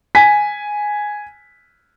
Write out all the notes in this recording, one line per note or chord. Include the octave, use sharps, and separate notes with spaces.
G#5 B6